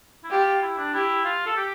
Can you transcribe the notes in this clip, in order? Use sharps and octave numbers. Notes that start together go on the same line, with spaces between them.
E4
F4 G4
E4
D4
E4 G4
F4
A4
G4